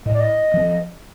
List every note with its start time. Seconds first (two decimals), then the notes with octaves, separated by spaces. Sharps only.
0.06 A2 D#5
0.14 D5
0.20 D#5
0.54 F3 C4